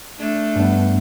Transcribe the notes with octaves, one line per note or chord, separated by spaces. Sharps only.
A3 D4
G2 B3